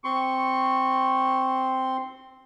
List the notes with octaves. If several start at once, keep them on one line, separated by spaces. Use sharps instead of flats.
C4 C6 C#6